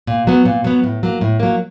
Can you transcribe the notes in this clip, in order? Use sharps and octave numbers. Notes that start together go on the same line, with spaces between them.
A#2
F#3 B3
A#2
F#3 B3
A2
F#3 A#3
A2
F#3 A#3